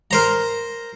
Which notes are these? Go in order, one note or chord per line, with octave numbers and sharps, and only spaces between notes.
A#4 C5 A#5